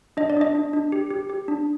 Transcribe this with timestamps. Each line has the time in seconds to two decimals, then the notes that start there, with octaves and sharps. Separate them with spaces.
0.17 D4 D#5
0.30 D5
0.37 D4 D#5
0.55 D4
0.73 D4
0.92 G4
1.11 G4
1.29 G4
1.48 D4